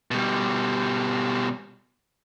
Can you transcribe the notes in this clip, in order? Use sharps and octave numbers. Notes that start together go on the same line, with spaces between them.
B2 G3